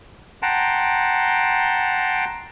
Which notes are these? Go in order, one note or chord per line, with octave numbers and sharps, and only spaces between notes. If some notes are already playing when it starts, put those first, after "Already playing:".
F#5 G5 A5 A#5 C6